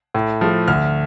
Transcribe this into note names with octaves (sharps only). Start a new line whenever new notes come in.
A2
F3 A3
D2 F6